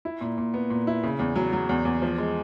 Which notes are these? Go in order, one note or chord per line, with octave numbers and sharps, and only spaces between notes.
E4
A#2
A#2
B3
A#2
E4
C#3
E2
F#3
F#3
E2
E2
F3
G#3